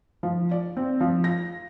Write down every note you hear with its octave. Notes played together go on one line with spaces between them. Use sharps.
F3
D5
C4
F3
A#6